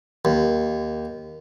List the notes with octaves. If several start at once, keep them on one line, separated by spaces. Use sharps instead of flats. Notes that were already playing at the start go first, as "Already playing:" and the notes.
D#2